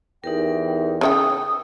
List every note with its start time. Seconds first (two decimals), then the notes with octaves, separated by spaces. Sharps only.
0.24 E2 D#4 G4 A#4 G5
1.01 C#3 C#4 G5 D#6 E6